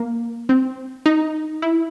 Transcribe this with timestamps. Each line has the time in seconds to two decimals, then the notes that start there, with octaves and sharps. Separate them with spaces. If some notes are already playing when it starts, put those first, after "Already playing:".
Already playing: A#3
0.49 C4
1.06 D#4
1.62 E4